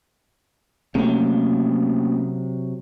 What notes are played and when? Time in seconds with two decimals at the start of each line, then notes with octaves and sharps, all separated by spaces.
0.95 C3 F#3 A3 A#3 C#4